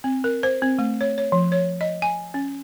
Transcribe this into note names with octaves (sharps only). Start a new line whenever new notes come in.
C4
A#4
C5
C4
A3
C#5
C#5
F3
C#5
D#5
G#5
C#4